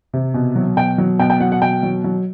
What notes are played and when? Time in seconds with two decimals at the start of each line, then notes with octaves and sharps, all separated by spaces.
0.13 C3
0.34 B2
0.56 F#3
0.77 B2 G5
0.98 F#3
1.19 B2 G5
1.30 G5
1.40 F#3 F#5
1.52 F#5
1.62 B2 G5
1.83 F#3
2.04 F#3